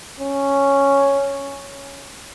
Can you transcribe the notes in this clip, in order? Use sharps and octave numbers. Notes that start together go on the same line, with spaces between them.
C#4